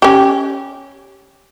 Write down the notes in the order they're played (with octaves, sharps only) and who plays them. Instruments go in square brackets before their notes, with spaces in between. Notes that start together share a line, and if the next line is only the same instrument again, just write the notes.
[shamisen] C#4 G4